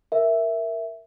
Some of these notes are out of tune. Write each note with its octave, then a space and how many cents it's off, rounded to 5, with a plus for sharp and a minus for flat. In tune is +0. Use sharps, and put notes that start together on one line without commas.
A#4 +0 E5 +0